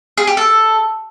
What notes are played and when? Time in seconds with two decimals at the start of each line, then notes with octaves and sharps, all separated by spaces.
0.18 G#4
0.27 G4
0.37 A4